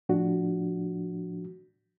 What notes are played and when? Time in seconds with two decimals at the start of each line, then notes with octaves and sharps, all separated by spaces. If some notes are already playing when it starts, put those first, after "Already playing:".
0.09 A2 F3 D4 F#4